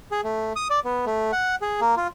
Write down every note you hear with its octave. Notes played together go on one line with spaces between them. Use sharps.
G#4
A3
D#6
D5
B3
A3
F#5
G#4
A#3
F4